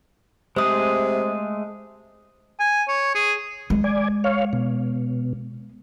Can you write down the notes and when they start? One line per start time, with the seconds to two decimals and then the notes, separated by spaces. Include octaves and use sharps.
0.56 C3 G#3 A3 G#4 C5 D#6
2.60 G#5
2.88 C#5
3.15 G#4
3.70 G#3
3.84 D5 G#5
4.24 C#5 F5
4.53 B2